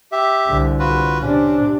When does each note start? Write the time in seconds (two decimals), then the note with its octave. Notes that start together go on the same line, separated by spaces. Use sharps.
0.12 G4 E5
0.48 C2 D3
0.79 F4 F#4 B4
1.21 C3 C#4 D4